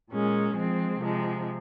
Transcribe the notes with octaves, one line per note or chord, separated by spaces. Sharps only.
A#2 G#3 C#4
F3 G#3 C4
C3 F3 G#3